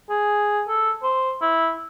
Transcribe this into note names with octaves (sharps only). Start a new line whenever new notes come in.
G#4
A4
C5
E4